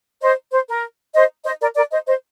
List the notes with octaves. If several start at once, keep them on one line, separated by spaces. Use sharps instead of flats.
C5 D#5
C5
A#4
C5 D#5
C5 D#5
A#4 D5
A#4 D5
C5 D#5
C5 D#5